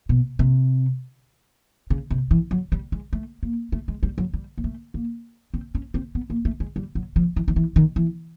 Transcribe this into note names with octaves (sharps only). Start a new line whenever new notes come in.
B2
C3
C#3
C3
E3
F#3
G3
G#3
A3
A#3
A3
G#3
G3
F#3
G3
A#3
A3
A#3
C4
C#4
C4
B3
A#3
A3
G#3
G3
F#3
F3
E3
D#3
E3
D#3
E3